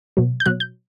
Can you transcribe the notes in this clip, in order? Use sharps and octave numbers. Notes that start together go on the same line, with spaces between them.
B2 F#3
G6
B2 F#3 F#6
G6